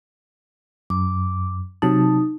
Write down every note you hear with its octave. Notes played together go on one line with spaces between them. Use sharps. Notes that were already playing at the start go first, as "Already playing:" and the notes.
F#2 D6
C3 F#3 D#4 A5